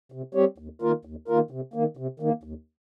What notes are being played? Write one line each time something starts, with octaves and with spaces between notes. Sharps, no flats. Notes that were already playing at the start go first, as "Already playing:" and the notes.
C3
G3 C4 G4 C#5
D#2
D#3 A#3 F4 A#4
D#2
D#3 A#3 F4 A#4
C3
D#3 A#3
C3
D#3 A#3
D#2